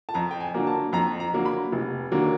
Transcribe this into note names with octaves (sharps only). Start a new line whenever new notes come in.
A5
F2 A#5
G5
G#5
D3 F#3 A#3
A5
F2 A#5
A#5
D3 F#3 A#3
B5
F1
D#2 D3 F#3 A#3